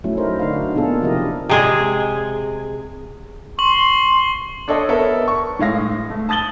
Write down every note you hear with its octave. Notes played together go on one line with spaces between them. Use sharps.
F#3 A3 C#4 E4
D#4 A#4 C5
D3 D4 D#4 F#4 F5
B2 A#3 D4 F4 G#4 A4
C3 F3 E4 G4 A#4 D#5
C3 G#3 G#4
C6 C#6 F#7
D4 A4 C#5 D#5 D#6
B3 A4 A#4 C#5 E5
C#6
A2 G#3 F5 A#6
A3
A5 D#6 A6 F#7 G7